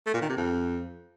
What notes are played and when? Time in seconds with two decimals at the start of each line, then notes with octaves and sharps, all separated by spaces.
0.06 A3
0.14 A#2
0.22 D#3
0.29 C3
0.37 F2